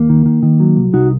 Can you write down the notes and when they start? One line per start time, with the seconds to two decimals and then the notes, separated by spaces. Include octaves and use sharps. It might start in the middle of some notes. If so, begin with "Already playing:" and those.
Already playing: D#2 A#3
0.09 D#3
0.26 D#3
0.43 D#3
0.60 F#3
0.76 C2
0.93 C2 D#4 F#4